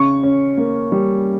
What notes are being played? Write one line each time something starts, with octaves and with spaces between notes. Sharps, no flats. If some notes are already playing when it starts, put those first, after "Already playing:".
Already playing: C#3 C#6
C#4
A#3
G3